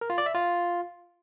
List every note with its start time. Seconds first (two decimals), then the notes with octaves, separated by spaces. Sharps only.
0.01 A#4
0.10 F4
0.18 D5
0.26 E5
0.34 F4